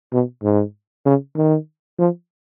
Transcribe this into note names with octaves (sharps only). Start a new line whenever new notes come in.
B2
G#2
C#3
D#3
F3